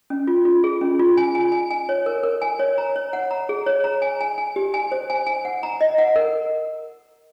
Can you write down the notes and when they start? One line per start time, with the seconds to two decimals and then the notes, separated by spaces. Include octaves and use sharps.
0.10 C#4
0.27 F4
0.45 F4
0.64 G#4
0.81 C#4
0.99 F4
1.17 G#5
1.35 G#5
1.52 G#5
1.71 G#5
1.89 C#5
2.06 A#4
2.23 A#4
2.42 G#5
2.59 C#5
2.78 A#5
2.96 C#5
3.13 F#5
3.31 A#5
3.49 G#4
3.66 C#5
3.84 A#5
4.02 G#5
4.21 G#5
4.38 G#5
4.56 G4
4.74 G#5
4.92 C5
5.10 G#5
5.27 G#5
5.45 F#5
5.63 A#5
5.81 D#5
5.98 F#5
6.16 A#4